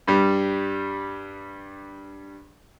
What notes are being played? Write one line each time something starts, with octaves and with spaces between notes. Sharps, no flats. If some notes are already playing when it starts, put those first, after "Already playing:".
G2 G3